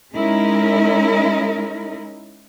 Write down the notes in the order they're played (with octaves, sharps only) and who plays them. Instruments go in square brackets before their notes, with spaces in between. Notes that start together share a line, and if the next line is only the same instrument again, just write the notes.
[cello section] G#3 C#4 D#4 E4 A#4